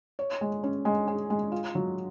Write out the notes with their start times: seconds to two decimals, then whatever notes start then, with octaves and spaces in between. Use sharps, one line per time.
0.19 C#5
0.41 G#3
0.64 C#4
0.85 G#3
1.08 G#4
1.30 G#3
1.52 F4
1.75 F#3